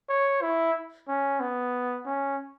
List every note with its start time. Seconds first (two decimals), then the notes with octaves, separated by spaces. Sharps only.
0.09 C#5
0.42 E4
1.08 C#4
1.40 B3
2.06 C#4